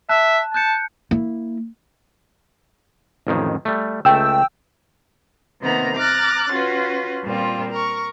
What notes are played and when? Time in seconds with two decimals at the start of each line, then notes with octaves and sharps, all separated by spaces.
0.09 E5 A5 F#6
0.54 A5 F#6 G6 C#7
1.11 A#3 E4
3.27 A1 F2 D#3
3.65 G3 A3
4.05 C#2 A3 G5 E6
5.61 C3 D#3 A#3 B3 A#5
5.98 A#5 D6 F6 F#6 A6
6.50 C#4 F4 F#4 B4
7.23 A#2 G3 C4 F4
7.70 A#4 C#6